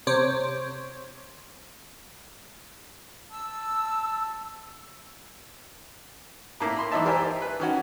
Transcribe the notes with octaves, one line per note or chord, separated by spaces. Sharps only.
C3 C5 C#5 D6
A5 E6
A2 A#3 E4
B5 C6
B1 E3 D#4 E5 A5
G4 A#4 C5 D5 E5 G#5
B4
D#3 C#4 F#4